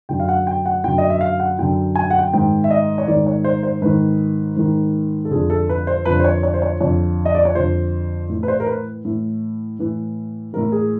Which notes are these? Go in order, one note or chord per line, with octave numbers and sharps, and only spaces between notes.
F#2 D3 G5
F5
F#5
G5
F#5
F#2 D3 G5
D#5
E5
F5
F#5
F#2 D3 G5
G#5
G5
F#5
G5
G#2 D#3 G5
E5
D#5
C#5
G#2 D#3 D5
C#5
C5
C5
G#2 D#3 B4
G#2 D#3
A4
F2 D3 G#4
A4
B4
C5
F2 D3 B4
C5
C#5
C#5
C5
C#5
F2 D3 C#5
D#5
D5
C#5
F2 D3 C5
A2 E3
B4
C5
A#4
B4
A2 E3
A2 E3
A2 E3 A#4
G#4